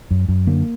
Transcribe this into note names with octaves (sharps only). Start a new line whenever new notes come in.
F#2
F#2
D3 A#3